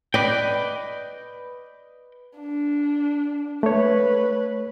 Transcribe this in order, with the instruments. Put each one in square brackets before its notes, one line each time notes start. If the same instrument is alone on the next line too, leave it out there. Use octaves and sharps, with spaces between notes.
[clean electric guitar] B4 D#5 G5 [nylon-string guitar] D5
[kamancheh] D4
[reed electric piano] A3 C#5 [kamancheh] B4